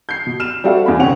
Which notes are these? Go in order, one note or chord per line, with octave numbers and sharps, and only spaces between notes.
G6 C7
B2
F6 E7
G3 C4 F#4 A4 E5 F5
E2 B5
G1 C3 C4 C#4 F#5 F7